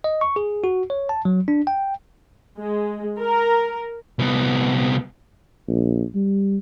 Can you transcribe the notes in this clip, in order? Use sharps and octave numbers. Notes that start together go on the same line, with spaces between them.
D#5
C#6
G#4
F#4
C#5
A5
F#3
D4
G5
G#3
A#4
C2 B3
A#1
G3